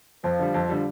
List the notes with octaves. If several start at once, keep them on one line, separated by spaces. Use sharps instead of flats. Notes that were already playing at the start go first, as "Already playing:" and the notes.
F2 F3
D3 G3
F2
D3 G3